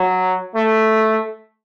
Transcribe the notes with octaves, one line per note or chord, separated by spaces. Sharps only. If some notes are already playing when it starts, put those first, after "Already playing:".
Already playing: F#3
A3